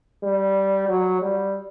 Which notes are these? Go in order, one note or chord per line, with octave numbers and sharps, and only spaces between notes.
G3
F#3
G3